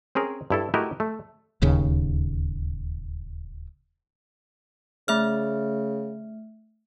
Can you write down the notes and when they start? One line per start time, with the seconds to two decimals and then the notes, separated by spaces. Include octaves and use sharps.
0.15 C4 C#4 G#4 A#4
0.50 G2 E4 A4
0.74 A3 E4 F#4 G4 A#4 D#5
1.00 A3
1.62 D1 D#2 C#3
5.08 C#3 A3 E5 F6